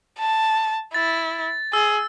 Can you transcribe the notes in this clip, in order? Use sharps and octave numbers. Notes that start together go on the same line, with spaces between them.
A5
E4 A6
G#4 E6